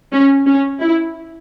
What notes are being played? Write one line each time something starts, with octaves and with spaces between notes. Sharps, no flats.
C#4
C#4
E4